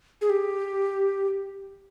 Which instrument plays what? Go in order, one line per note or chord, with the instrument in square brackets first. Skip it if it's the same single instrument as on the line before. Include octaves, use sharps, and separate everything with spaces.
[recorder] G#4
G4